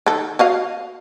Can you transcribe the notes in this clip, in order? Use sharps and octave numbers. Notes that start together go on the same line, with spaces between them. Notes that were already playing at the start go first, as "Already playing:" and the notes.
D#3 A4
F#4 D#5 F5